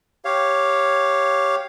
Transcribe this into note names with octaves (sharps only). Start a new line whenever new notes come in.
G4 C#5 F5